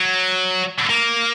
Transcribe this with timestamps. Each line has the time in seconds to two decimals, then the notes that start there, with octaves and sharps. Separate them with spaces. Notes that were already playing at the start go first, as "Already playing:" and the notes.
Already playing: F#3
0.90 A#3